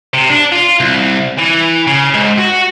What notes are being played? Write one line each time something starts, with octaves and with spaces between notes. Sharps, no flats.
C3
D4
F4
C2
E3
C#3
G#2
F#4